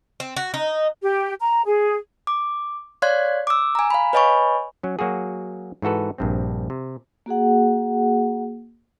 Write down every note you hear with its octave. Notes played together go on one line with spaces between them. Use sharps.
C4
F#4
D#4
G4
A#5
G#4
D6
C#5 D5 F5 C6 F#6 G#6
D6 E6
G#5 A#5
F5 B5
B4 C#5 D#5 G#5 B5 C#6
F#3 C#4
F#3 A#3 F#4 G#4
G#2 E3 F#4 A4 B4
A#1 G2 C4
C3
A#3 F#4 G#4 F#5